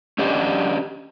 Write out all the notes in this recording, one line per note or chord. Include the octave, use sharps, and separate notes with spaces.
C#4 D4 G4 D#5